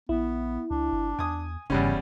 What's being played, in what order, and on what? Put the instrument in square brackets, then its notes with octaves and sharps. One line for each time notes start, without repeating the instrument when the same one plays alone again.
[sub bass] A#1 [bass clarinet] B3 [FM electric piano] E4
[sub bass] C#2 [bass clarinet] D4
[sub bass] G1
[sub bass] E2 [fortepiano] G#5 D#6
[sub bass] F1 [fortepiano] E2 G3 C#4 [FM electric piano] G2 C#3